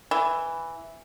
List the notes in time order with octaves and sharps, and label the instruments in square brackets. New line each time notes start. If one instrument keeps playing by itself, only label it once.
[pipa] E3